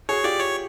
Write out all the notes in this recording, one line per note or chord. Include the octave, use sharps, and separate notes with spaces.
F#4 G#4 C#5
F4 G4 D5
C#5